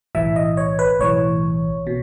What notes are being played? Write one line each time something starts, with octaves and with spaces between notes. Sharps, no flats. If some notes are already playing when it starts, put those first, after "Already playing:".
B1 A2 E3 E5
D#5
C#5
B4
B1 A2 E3 C#5
B2